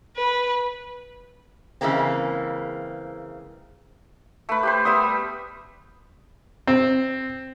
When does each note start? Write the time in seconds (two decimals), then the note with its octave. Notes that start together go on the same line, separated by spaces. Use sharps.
0.17 B4
1.81 C#3 E3 G#3 A#3 C4
4.49 A3 B4
4.63 G4 B4 C5
4.85 G3 B3 E5 D#6
6.67 C4